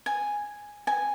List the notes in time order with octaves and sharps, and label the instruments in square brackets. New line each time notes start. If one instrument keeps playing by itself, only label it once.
[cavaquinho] G#5
G#5